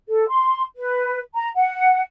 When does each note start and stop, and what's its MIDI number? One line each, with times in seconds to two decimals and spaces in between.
0.09 0.26 69
0.28 0.61 84
0.76 1.19 71
1.34 1.49 82
1.55 2.00 78